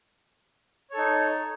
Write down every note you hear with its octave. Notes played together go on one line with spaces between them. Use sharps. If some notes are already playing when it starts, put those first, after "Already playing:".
D#4 A4 C#5